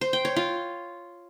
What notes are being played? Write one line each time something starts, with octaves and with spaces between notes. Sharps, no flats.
C5
G5
C#5
F4